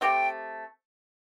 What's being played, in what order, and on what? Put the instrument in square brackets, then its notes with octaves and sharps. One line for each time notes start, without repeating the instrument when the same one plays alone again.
[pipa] A3 C4 G4 [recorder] G5